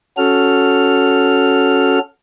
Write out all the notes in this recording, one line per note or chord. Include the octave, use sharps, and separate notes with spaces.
C#4 F#4 A4 F6